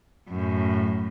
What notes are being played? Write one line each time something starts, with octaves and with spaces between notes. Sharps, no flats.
F#2 A2